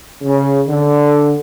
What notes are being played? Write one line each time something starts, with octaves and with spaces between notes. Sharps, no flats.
C#3
D3